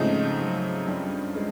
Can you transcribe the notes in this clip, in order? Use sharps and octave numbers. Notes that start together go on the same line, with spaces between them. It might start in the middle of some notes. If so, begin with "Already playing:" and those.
Already playing: G#2 C#3 F3 G#3 A3 C4 D#4
F#3
G2 G3
G#3